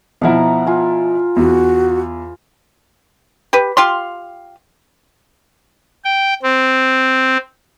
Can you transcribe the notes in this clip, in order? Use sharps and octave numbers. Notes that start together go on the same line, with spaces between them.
B2 F3 E4 F5 F#5 A#5
F4 G#5
E2 F#4
G4 B4
F4 G4 F5 C6
G5
C4